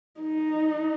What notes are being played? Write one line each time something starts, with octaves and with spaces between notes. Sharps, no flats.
D#4